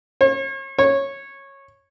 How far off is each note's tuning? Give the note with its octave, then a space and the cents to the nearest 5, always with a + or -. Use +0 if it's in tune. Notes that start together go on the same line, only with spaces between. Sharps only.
C#5 -40
C#5 -15